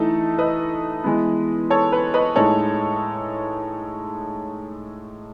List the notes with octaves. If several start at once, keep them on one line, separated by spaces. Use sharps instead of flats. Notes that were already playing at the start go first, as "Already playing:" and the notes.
Already playing: E3 A3 D#4 A4
B4 D#5
E3 G#3 B3
A4 C#5
B4
B4 D#5
A2 G#3 D#4 A4 C#5